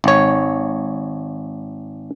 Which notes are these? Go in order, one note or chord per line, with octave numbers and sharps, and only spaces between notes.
G#1 C#5